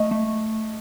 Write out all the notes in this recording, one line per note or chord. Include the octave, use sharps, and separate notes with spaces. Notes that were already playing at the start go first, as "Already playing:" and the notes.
Already playing: A3 D#5
A3